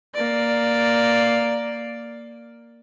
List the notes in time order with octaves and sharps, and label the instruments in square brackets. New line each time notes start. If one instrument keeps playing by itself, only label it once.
[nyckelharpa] A#3 D5